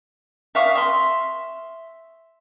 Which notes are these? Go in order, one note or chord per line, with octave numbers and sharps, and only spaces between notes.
E5 F5 C#6 D#6
E5 C6